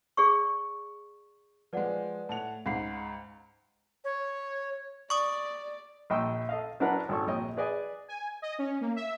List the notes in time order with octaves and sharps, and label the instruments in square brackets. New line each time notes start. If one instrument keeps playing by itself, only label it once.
[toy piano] G#4 D5 C#6
[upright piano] F3 G#3 [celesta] B4 D5 F#5
[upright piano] A2 F#5 F7 [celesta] A5
[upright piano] C#2 G#2 B5 [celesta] F5 F#5 C7
[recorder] C#5
[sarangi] D5 [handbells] C#6 D#6
[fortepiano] A#1 D#5 G5 C#6 E6
A4 D#5 F5
F#3 D4 E4 A#4 B4 F#5
G#1 A4 C#6
A#1 C#5 D#5 G5
G#4 B4 D5 D#5 G#5
[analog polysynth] G#5
D#5
C#4
A#3
E5